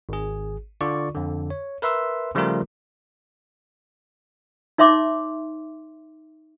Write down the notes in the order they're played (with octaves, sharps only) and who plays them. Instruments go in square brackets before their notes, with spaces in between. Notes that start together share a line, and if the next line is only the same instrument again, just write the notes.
[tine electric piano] G#1 G#4
D3 F4 D5 C#6
F2 D3
C#5
A#4 B4 E5 C6 E6
C#3 F3 G3 A3 F4 A#4
[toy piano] D#4 C#5 E5 C6 D6